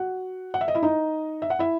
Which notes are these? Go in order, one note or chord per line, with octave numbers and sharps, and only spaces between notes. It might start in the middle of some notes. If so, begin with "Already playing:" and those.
Already playing: F#4 F#5
F#5
E5
D#5
E4 E5
D#4 D#5
E5
F#5
E4 E5